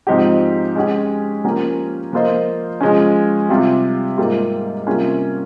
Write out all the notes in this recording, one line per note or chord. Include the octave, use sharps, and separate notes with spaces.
G#2 F3 C4 D#4 G4
G#3 C#4 G4
F3 A#3 C#4 G4 A#4
F3 A#3 F4 C5 D#5
F3 G#3 C#4
C3 G3 C4 F4
G#2 G3 A#3 F4
C3 G3 A#3 C#4 F4